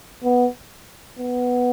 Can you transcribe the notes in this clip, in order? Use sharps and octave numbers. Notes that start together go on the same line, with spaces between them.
B3
B3